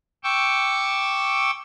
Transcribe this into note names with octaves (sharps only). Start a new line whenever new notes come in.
G5 C#6 D6 E6